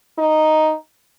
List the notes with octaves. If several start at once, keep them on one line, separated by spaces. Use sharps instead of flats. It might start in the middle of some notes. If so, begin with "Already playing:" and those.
D#4